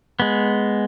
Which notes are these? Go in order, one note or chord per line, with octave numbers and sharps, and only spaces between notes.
G#3 B3